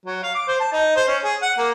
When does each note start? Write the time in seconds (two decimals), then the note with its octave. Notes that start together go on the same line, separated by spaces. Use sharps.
0.06 F#3
0.23 F5
0.35 D6
0.48 C5
0.60 A5
0.73 D#4
0.97 C5
1.08 C#4
1.24 G#4
1.42 F#5
1.58 A#3